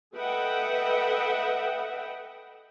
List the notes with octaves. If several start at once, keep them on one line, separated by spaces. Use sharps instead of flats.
A4 B4 D#5 E5 F#5 G5